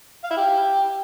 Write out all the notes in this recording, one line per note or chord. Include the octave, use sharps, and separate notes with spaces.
F5
E4
G4